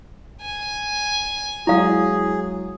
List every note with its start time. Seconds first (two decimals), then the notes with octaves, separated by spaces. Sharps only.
0.42 G#5
1.67 F#3 G#3 E4 G#4 F5